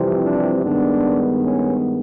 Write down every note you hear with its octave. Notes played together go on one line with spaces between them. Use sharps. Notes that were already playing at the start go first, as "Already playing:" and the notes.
Already playing: F2 C3 E3 G3 C4
D4
G2 D#3 G#3 B3 D4
C#4